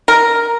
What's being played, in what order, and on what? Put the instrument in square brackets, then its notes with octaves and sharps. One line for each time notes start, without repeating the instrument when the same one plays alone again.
[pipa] A#4